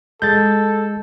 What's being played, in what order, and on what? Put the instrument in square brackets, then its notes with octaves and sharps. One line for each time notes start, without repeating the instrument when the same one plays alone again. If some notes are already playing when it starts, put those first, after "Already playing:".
[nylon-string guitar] G#3 [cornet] A4 [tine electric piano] G6 A6